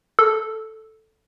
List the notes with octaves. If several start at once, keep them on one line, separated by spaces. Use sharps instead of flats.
A4